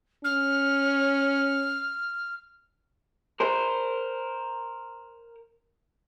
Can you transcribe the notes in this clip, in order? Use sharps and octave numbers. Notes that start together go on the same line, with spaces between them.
C#4 F6
A#4 C5